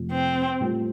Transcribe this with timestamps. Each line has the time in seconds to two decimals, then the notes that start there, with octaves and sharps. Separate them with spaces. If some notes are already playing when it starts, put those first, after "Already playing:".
Already playing: F2 C3 F3 A3
0.11 C4
0.60 A2 G3 C4 F4